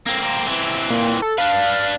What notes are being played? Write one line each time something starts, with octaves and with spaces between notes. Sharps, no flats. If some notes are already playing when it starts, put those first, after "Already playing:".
A#3 C4
E3 C4
A#2
A4
D4 B4 F5